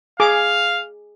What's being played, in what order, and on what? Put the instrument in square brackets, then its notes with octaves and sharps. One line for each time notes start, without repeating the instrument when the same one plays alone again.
[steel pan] G#4 D6 [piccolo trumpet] F5